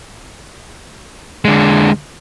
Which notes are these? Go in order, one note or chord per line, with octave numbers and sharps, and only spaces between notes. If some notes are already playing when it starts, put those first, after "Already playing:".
D3 G#3